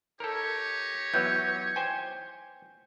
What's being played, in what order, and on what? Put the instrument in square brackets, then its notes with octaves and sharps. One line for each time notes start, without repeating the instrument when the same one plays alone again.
[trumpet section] D#4 G4 C#5 [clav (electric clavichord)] A4 A#4
[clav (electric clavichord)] E3 F#3 B3 [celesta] G6
[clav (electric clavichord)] C5 G5 G#5